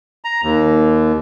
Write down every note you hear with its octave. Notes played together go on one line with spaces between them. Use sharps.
A#5
D#2